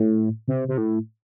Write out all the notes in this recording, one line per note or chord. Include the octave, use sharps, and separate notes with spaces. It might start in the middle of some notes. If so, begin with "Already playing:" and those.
Already playing: A2
C3
C3
A2